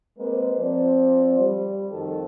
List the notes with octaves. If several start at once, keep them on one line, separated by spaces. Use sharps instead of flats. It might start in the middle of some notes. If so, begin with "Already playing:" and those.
G#3 A#3 C4 A#4 B4
F3 C4 D5
G3
F2 D#3 F3 F#4 A4